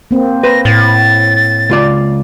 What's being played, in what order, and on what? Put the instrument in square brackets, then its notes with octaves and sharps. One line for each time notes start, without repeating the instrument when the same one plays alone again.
[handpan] A#3 C4
[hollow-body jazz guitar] B4 C5 [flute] A#6
[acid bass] A2 [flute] A6
[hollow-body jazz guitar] C#2 F4 D5